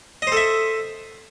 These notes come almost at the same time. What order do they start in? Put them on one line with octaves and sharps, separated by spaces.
D#5 C5 A4 E5